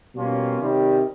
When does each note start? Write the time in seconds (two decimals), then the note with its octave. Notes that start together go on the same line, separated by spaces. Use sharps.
0.15 B2 G3 A#3 C#4 F4
0.58 C3 D#3 G3